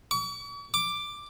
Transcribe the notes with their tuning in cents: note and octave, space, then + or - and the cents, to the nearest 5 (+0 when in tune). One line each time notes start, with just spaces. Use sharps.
C#6 +45
D6 +5